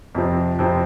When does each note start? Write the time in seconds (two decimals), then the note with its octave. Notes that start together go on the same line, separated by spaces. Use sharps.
0.15 F2 C3 F3 C4
0.59 F2 C3 F3 C4